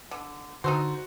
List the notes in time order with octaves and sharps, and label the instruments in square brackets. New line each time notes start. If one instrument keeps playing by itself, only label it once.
[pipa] D3
[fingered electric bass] D3 [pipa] D#4 A4 C5 [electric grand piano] F#4